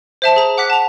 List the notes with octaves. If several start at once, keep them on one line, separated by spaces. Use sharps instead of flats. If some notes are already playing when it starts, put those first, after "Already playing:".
C5 E5 A5
G#4 A#5
F#5 D6 F#6 B6
A5 F7